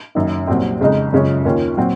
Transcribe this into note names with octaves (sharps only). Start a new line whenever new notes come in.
F#1 F#2 D#3
C2 A#2 F#3 C4
F2 C#3 G#3 D#4
F#2 C#3 G#3 C#4 F4
D#2 D#3 A#3 C#4 F4
A#2 F#3 C4